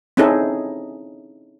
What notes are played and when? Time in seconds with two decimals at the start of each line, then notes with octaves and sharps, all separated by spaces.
0.17 C4 C#4 D#4 E4 G#4 A4